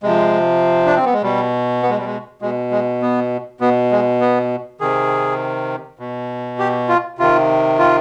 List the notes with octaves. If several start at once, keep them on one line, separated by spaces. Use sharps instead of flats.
C3 F3 G#3
D4
C4
B3
G#3
B2 G3
B3
G#3
G3
G#3
B2 G#3
G#3
B3
B2 B3
G#3
B3
C3 D#3 G#4
B2
G4
F4
C3 D#3 F4
F4